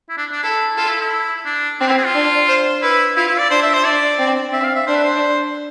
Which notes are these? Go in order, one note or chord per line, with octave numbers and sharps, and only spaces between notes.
E4
D4
D4
E4 A4
F4 A4
E4
E4
D4
C4 D4
E4
G#4
F4
D4
C5
E4 B4
E4 F4
E4
D5
D4 C5
E5
C5
D4 D5
C4
C4 E5
F5
E5
D4 C5
B4
C5